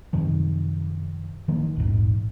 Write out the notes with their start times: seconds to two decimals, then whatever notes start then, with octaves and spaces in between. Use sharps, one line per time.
0.13 F#2 C3 D#3 F3
1.48 D3 D#3 F3 A#3
1.76 A#1 E2 G#2